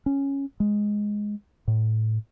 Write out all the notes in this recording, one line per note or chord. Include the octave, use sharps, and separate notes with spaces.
C#4
G#3
A2